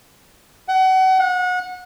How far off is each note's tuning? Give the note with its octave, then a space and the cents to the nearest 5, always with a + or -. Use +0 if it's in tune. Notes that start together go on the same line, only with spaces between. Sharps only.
F#5 +30
F#5 -30